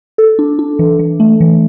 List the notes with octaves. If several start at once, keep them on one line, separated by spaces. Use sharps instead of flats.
A4
D4
D4
E3
E3
A3
E3